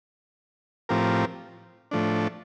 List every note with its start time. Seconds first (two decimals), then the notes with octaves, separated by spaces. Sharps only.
0.89 A2 F3 C4 G4 A#4
1.91 A2 F3 A3 D4